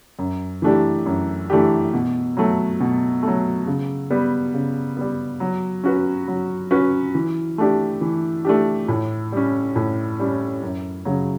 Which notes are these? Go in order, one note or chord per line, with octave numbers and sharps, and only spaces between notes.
F#2
E3 A3 D4 G4
F#2
E3 A3 D4 G4
B2
F#3 A3
B2
F#3 A3
C#3
G3 B3
C#3
G3 B3
F#3
C#4 F#4 B4
F#3
C#4 F#4 B4
E3
A3 D4 G4
E3
A3 D4 G4
A2
G3 C#4
A2
G3 C#4
F#2
C#3 F#3